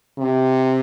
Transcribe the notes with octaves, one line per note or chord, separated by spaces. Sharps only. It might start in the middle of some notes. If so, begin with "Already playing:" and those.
C3